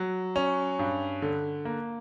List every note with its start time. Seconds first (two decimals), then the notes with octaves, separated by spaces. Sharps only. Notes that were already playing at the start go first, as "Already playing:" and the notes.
Already playing: F#3
0.36 C#4
0.79 G2
1.22 D3
1.65 A#3